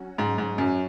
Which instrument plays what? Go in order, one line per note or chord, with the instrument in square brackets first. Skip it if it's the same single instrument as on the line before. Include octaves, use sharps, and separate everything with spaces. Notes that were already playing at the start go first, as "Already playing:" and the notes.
Already playing: [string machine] F#3 C#4 F#4
[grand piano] G#2
G#2
F#2